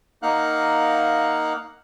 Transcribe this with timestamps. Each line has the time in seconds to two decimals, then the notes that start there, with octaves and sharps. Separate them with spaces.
0.23 A#3 D#4 F5 F#5 F#6